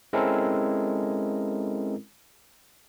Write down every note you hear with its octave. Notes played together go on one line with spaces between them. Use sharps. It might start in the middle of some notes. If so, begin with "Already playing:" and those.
G#3 C4 C#4 E4 A4 A#4